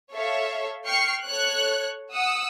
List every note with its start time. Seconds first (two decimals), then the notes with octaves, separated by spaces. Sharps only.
0.14 A4 C#5 E5 F5
0.85 G5 C#6 F6 C7 C#7
1.25 A4 C#5 F#6
2.13 F#5 D#6 E6